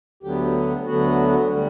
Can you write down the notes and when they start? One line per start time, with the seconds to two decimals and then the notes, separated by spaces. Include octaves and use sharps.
0.23 D2 D3 F#3 B3 G4
0.86 D2 D3 F#3 B3 F#4
1.50 D3 G3